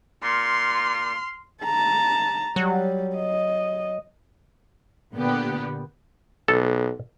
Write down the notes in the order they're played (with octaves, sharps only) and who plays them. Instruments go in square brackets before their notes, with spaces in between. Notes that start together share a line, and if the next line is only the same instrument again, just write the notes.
[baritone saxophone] A#2 [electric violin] C6 F6
[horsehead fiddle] A5 A#5
[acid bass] F#3 [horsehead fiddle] G3
[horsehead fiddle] D#5
[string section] A#2 D3 B3 G4
[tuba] B1 [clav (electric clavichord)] A4